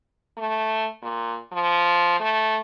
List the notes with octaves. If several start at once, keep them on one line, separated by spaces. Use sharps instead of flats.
A3
A#2
F3
A3